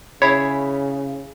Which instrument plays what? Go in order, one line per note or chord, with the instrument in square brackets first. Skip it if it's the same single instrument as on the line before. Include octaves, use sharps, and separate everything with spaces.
[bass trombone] C#3 [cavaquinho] E4 G#4 B5 [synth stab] C#5